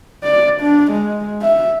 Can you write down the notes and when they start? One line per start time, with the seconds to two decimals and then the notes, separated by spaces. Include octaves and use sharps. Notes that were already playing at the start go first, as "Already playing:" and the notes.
0.24 D5
0.61 D4
0.92 G#3
1.42 E5